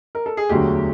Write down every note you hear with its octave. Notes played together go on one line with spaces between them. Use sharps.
A#4
A4
G#4
E1 D2 D3 F#3 G4